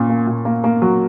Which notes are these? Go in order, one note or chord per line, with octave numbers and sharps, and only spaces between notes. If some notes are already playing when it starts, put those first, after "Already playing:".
Already playing: A#2 C#4
A#3
A#2
A#3
A#3
F#3